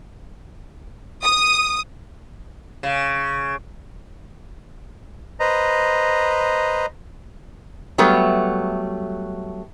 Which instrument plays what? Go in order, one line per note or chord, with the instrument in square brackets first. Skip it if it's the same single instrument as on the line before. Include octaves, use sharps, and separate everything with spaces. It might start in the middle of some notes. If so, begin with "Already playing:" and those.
[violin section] D#6
[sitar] C#3
[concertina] B4 C5 D#5 A#5
[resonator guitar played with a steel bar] F#3 G3 A3 B3